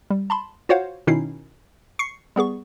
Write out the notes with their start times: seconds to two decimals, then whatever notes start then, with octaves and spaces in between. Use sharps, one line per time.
0.10 G3
0.30 A5 B5 C6
0.69 F4 F#4 C5 C#5 F5 F#5
1.07 B2 D#3 C#4 D#4 E4 C7
1.99 C#6 C7 C#7
2.36 G3 B3 G#4 C#6